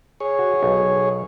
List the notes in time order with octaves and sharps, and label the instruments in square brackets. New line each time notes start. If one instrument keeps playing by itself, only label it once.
[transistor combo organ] G#4 C#5
[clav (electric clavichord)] F#4
B1